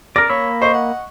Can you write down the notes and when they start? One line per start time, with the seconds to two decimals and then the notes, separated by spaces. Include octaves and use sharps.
0.16 A#4 D5 A#6
0.29 A#3 C#5 B5 E6
0.61 C5 D#5 C#6
0.74 F#5